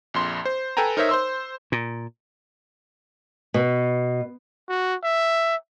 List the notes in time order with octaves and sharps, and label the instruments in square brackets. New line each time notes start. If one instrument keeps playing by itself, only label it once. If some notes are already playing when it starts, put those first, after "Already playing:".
[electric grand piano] A#1 F2 C6
C5
A4 B4 G5 G#5 A#5
D#4 A#4 C5 C#5 D#5 E5
C5 C6 E6
[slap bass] A#2
[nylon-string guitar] B2
[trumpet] F#4
E5